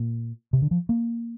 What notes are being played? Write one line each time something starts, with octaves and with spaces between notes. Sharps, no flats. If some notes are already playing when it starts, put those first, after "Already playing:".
Already playing: A#2
C3
D3
F3
A#3